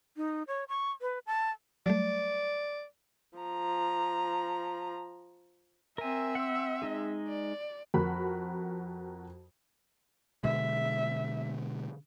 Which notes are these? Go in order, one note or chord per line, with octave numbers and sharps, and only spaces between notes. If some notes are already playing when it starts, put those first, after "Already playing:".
D#4
C#5
C#6
B4
A5
F#3 G3 A3 D5
F3 A#5
C4 A#4 E5 G#5
F#5 E6
G#3 D#4 G#4
D5
F2 F#4 A#4 B5
B2 D3 G#3 E5